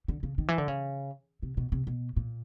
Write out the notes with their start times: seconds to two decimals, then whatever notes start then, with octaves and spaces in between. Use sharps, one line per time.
0.08 D3
0.23 C#3
0.38 D#3
0.48 E3
0.58 D3
0.68 C#3
1.43 C3
1.57 B2
1.72 C3
1.87 B2
2.16 A#2